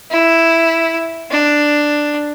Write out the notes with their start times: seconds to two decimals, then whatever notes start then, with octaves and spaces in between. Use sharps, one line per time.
0.10 E4
1.30 D4